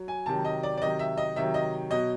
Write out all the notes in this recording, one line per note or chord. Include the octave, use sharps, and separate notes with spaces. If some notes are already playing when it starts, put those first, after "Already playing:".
Already playing: F#3
G#5
C3 D#3 F#3 A5
D#5
D5
D5
C3 D#3 F#3 D#5
E5
D#5
C3 D#3 F#3 E5
D#5
B2 F#3 D#5